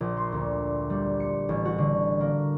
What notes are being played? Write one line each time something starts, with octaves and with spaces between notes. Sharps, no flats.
A#1
C6
D2
G3
C#7
A1
F#4
D3
A#3